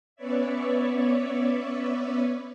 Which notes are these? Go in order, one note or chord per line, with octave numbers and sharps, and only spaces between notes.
B3 C#4 B4 C#5 D5 E5